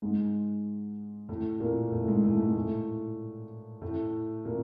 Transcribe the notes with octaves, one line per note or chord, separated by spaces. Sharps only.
G#2 G#3
A2 A3
A#2 A#3
A2 A3
G#2 G#3
A2 A3
G#2 G#3
A2 A3
A2 A3
A#2 A#3